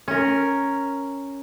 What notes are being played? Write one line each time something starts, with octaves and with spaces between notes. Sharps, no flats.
C#4 A#4